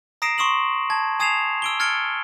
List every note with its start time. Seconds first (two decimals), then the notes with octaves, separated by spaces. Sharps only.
0.22 A#5 D#6 A#6 C7 D7 E7
0.38 C6 C#6 D#6 E7 F#7
0.90 A5 G#6
1.20 G#5 D#6 G#6 C7 E7 F7
1.62 E6 D7 G7
1.80 F6 G#6 A6 C#7 D7 G7